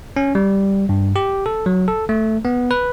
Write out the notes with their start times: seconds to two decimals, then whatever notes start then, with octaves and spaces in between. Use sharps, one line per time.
0.16 C#4
0.35 G3
0.89 G2
1.16 G4
1.46 A4
1.66 F#3
1.88 A4
2.09 A3
2.45 B3
2.71 B4